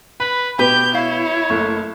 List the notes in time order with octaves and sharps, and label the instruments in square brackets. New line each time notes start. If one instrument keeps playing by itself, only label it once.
[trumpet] B4 [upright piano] B5
[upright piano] B2 [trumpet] G4 [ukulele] B4 [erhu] G6
[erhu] E4 [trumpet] C#5 [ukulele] F5
[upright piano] F#1 A3 C#6